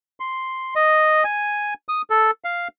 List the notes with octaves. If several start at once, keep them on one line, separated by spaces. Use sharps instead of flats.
C6
D#5
G#5
D#6
A4
F5